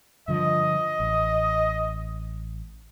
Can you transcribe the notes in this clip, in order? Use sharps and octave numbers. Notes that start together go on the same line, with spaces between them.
G2 D3 F3 D#5
A1